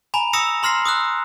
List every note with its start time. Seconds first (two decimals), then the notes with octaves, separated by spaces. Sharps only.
0.14 G#5 A#5 B5
0.33 D#6 E6 A#6 C#7 E7 F7
0.63 A#5 C6 F6 A#6 C7
0.85 D#6 E6 F#6